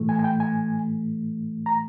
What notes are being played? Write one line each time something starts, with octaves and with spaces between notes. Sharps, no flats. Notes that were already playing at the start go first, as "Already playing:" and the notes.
Already playing: A2 E3 A3
G#5
G#5
G5
G#5
A#5